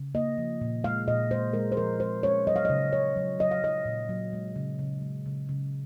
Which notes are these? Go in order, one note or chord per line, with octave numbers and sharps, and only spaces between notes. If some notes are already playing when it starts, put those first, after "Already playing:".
Already playing: C#3
A#3 D#5
F3
A#2
G#3 F5
A#2 D#5
G#3 C5
G#3 A#4
C5
F3 A#4
G#3 C5
G#3 C#5
F#3 D#5
F5
D#5
C#3
C#3 C#5
F#3
F#3 D#5
F5
F#3 D#5
A#2
F#3
G#3
C#3
C#3
G#3
C#3
C#3